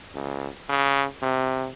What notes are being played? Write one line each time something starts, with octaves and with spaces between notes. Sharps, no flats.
C#2
C#3
C3